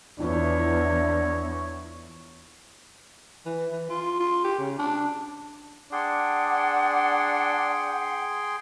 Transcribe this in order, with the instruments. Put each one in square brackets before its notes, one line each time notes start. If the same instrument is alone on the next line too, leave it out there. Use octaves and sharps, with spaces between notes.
[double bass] E2 [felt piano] E3 F3 B3 [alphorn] D4 [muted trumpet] C#5
[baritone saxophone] E3
E3
F4
F4
G4
C#3
D4
[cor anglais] D4 [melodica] G#4 G5 C6 [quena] F#5